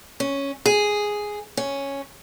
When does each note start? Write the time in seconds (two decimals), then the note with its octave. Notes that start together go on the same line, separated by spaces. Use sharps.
0.20 C#4
0.66 G#4
1.57 C#4